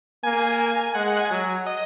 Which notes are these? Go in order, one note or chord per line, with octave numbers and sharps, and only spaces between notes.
A#3 G#5
G#5
G#3 F#5
F#5
G#5
F#3
D#5